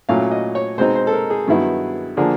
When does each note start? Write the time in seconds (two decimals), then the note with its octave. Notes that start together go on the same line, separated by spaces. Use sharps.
0.09 A#2 F#3 A3 C#4 E4 F5
0.31 D#5
0.55 C#5
0.78 B2 G#3 C4 D#4 C5
0.95 C5
1.07 A4
1.13 A#4
1.30 G#4
1.48 G2 D#3 F#3 B3 E4
2.17 D3 F3 A#3 D4 G#4